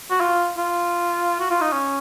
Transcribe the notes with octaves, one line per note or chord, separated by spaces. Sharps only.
F#4
F4
F4
F#4
F4
D#4
C#4